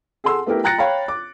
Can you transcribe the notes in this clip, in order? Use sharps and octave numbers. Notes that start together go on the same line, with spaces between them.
G#4 A4 F#5 C6 E6
A3 B3 E4 G4 A#4
G5 A#5 F#6 A6 A#6 C#7
C#5 F5 G5 A#5 B5
D6